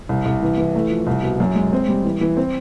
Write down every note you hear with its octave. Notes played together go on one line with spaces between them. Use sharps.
C2
C2
E3
E3
A3
F3
C2
B2
F#2
G#3
C4
G3
E3
E3
C4